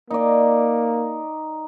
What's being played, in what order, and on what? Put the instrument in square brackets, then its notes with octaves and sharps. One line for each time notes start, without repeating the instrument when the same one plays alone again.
[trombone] A#3 [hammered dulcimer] D#4 D5